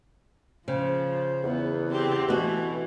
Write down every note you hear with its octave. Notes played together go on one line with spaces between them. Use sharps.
C#3 F3 C5
E2 B3
C4 G4
B2 E3 A3 F#4